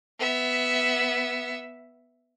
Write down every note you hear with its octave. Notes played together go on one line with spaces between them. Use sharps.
B3 E5